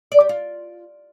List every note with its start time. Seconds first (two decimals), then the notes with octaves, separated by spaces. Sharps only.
0.12 D5
0.20 G4
0.29 F4